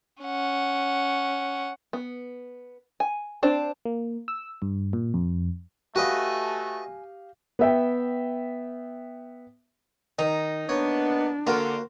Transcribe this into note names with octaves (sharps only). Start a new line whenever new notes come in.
C#4 F#5
B3
G#5
C4 D4 C5
A#3
E6
G2
A#2
F2
A3 F#4 G4 B4 D#5 F5 G#5
B3 E5 G5
D#3 D#4
A#3 B3 D4 C#5
D3 A#3 C4 F4 F#4 A#4